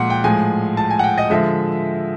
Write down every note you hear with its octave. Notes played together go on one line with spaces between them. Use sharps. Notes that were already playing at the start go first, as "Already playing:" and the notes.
Already playing: A#2 F3 G#3 F#5
G5
A2 F3 G#3 G#5
A5
G#5
F#5
G5
D#5
D3 F3 G#3 E5